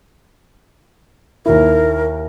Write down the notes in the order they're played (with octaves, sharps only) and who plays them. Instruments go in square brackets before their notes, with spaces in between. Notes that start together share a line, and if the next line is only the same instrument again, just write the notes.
[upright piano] D#2 E4 [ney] A#4